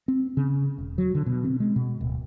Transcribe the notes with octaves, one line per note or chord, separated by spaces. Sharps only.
C4
C#3
E1
F#3
D3
B2
C4
G#3
B2
D1